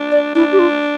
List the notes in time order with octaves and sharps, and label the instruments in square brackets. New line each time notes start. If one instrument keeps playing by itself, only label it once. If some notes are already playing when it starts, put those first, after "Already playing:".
Already playing: [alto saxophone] D4
[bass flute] D5
[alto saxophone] D4 [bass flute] E4
[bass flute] G4
F4